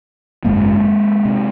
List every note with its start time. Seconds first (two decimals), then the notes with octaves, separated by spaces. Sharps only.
0.44 G#1 F#2 C#3 G#3 A#3
1.25 C3